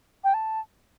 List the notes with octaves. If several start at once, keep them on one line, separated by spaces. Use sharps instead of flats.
G5
A5